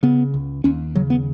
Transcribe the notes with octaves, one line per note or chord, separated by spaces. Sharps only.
C#3 B3
C#2
D#2 C#4
C#3 F#3
B3